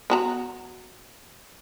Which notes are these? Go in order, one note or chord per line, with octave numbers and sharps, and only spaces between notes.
B3 F#4 A#5